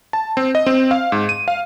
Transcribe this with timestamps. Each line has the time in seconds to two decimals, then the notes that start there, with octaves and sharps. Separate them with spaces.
0.13 A5
0.37 C4
0.55 D#5
0.66 C4
0.91 F5
1.12 G#2
1.29 D#7
1.48 F5